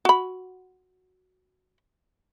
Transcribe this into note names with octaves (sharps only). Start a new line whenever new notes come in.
F#4 B5